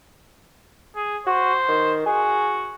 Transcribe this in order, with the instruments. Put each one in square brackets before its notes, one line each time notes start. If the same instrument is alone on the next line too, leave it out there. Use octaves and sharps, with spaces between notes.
[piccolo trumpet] G#4
[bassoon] F#4 [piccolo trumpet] C5
[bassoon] D#3
[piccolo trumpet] F#4 [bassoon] G#4